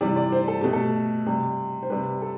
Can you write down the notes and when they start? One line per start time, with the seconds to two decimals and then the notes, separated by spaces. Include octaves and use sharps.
0.01 C3 E3 G3 D5
0.16 D5
0.32 C5
0.48 A4
0.61 B2 A3 G4
0.73 A4
1.26 C3 G3
1.83 C5
1.90 C3 G3 B4
2.22 A4